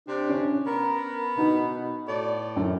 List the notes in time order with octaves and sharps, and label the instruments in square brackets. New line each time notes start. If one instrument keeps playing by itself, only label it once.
[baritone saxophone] C3 [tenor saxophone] D4
[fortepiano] C#4
[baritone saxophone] B3 [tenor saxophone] A#4
[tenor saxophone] B2 [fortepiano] D#4
[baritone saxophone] A2 [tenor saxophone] D5
[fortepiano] F#2